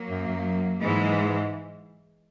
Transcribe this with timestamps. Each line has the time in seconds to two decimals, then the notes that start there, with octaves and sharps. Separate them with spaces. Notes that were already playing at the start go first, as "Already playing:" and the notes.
Already playing: F#3 A#3
0.10 F#2
0.27 F#2
0.82 G#2 E3 G#3